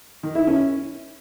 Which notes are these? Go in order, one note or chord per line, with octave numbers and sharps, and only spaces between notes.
D#3
E4
C#4